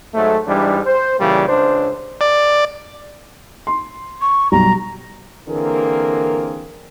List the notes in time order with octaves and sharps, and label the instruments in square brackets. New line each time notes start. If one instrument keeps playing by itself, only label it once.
[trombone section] G#2 F#3 A3
G#2 E3 G3 D4
C5
A#2 C#3 E3 G3
C#2 D4 C5
[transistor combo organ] D5
[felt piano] C6
[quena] C#6
[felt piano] B1 G3 [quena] A#5
[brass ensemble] D3 E3 A#3 C4 G#4 A#4